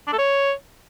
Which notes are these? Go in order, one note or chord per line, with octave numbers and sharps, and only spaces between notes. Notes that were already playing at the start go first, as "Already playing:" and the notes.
D4
A4
C#5